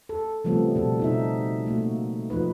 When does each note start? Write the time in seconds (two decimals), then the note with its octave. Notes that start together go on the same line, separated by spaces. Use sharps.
0.09 A4
0.44 C#3 F3 G3 A3 B3 C4
0.75 B2 A4
1.00 B2 D#4 E5
1.66 A3 A#3 F#4
2.30 F3 D#4 B4